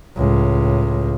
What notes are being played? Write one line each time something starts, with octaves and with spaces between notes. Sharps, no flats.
C#2 A2